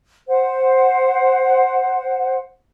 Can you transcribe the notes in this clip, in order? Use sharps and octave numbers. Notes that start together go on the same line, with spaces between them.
C5 F#5